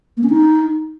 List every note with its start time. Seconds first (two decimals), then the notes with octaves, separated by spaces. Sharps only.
0.17 A#3
0.23 C#4
0.30 D#4